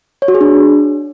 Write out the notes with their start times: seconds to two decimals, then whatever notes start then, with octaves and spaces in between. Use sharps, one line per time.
0.22 C#5
0.28 F#4
0.34 G#4
0.41 D4